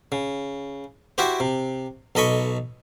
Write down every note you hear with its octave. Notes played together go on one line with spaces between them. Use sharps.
C#3
E4 F#4 G4 C5
C3
B1 A4 D#5 B5 C#6